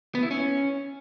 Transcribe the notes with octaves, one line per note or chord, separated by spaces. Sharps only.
B3
E4
C#4